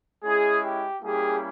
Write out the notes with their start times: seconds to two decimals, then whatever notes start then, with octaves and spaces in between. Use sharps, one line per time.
0.23 G#3 C#4 E4 G#4
0.63 G4
1.02 G3 A#3 C#4 E4 G4 G#4